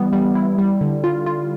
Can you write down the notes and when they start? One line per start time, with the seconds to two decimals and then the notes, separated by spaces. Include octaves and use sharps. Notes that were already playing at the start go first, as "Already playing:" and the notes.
Already playing: E3 G3 B3
0.13 G3
0.35 E4
0.58 G3
0.81 D3
1.04 F4
1.26 F4